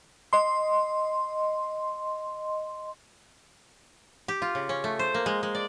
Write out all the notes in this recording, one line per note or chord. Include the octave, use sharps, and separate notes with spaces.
D#5 C6
G4
F4
C#3
C#4
A3
C5
A#3
G#3
G#3
D5